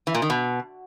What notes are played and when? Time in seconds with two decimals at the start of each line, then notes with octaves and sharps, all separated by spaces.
0.07 E3
0.15 A#2
0.22 D#3
0.30 B2